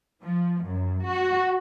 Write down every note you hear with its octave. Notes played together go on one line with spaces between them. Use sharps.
F3
F#2
F#4